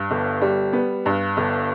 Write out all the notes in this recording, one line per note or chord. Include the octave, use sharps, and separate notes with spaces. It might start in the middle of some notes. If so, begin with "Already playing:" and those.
Already playing: G2
G1
G3
B3
G2
G1